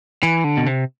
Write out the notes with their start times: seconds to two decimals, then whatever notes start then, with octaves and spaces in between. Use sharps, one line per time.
0.23 E3
0.44 D3
0.57 B2
0.66 C3